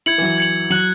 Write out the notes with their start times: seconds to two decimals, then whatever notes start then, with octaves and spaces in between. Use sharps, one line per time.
0.06 E4 G#6 C#7 F#7
0.18 E3
0.22 F#3
0.38 G#6 C#7 F#7
0.70 F#3 F#6 C#7 F#7